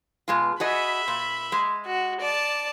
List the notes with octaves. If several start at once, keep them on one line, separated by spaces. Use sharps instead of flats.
B2 G#3 F4
F#4 G#4 D#5 E5 B5
A#2
G#3
F#4
D5 A5